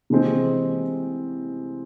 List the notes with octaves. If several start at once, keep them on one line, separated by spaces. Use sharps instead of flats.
C3 E3 G#3 C4